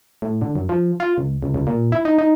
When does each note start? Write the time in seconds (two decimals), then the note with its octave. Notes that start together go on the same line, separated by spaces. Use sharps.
0.22 A2
0.41 D3
0.56 F#2
0.69 F3
1.00 F4
1.18 C#2
1.43 C#2
1.54 C#2
1.67 A#2
1.92 E4
2.05 D#4
2.18 D#4